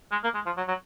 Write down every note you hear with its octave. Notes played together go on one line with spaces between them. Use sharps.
G#3
A#3
G#3
F3
F#3
F#3